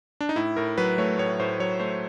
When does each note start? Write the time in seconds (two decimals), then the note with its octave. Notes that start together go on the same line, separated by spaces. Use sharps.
0.21 D4
0.29 D#4
0.36 A2 E4
0.57 A2 A#4
0.78 F#3 B4
0.98 A3 C#5
1.18 A2 C#5
1.39 A2 C5
1.60 F#3 C#5
1.80 A3 C5